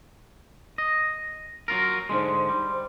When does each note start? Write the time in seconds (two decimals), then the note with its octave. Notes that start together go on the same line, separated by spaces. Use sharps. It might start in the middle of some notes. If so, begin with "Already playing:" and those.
0.78 D#5
1.68 F#3 F4 A#4
2.09 G#2 D3 G#3 C5 C6
2.49 G3